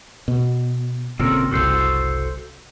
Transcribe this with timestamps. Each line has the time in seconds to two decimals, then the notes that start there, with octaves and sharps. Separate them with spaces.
0.28 B2
1.19 G#1 A#2 C#3 C4 A4 A#4
1.51 F#1 C2 F#4 A4 C5